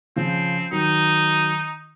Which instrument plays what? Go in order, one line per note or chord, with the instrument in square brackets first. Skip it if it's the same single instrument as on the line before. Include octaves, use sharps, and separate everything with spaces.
[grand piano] C#3 F3 [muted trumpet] C4
[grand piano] D#3 F#3 [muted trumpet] D#4